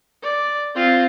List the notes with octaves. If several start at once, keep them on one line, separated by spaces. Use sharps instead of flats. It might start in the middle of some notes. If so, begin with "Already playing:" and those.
D5
C4 F4